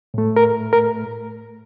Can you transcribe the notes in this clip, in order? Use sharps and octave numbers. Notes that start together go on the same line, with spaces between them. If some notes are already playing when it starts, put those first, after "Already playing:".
A2 A3
A#4
A#4